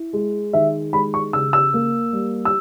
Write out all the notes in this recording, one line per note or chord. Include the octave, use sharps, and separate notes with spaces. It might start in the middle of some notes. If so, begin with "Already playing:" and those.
Already playing: E4
G#3
D#3 E5
G#3 B5
C#6
C#3 E6
E6
A#3
G3
E6